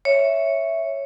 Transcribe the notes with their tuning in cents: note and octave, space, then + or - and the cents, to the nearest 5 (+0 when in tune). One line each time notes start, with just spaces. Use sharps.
C#5 +0 E5 +0